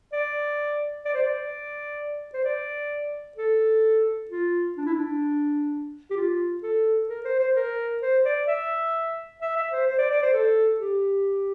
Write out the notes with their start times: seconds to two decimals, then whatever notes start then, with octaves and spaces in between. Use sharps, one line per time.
0.13 D5
1.05 D5
1.14 C5
1.23 D5
2.34 C5
2.44 D5
3.37 A4
4.31 F4
4.78 D4
4.85 E4
4.94 D4
6.11 G4
6.17 F4
6.63 A4
7.09 A#4
7.25 C5
7.39 C5
7.56 A#4
8.02 C5
8.25 D5
8.48 E5
9.42 E5
9.56 E5
9.72 C5
9.88 C5
9.98 D5
10.11 D5
10.22 C5
10.33 A4
10.80 G4